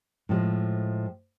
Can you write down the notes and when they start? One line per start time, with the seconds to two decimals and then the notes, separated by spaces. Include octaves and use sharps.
0.29 A2 F3 G#3